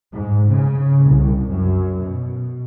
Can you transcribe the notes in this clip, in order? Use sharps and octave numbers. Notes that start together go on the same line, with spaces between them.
G#2
C#3
C2
F#2
B2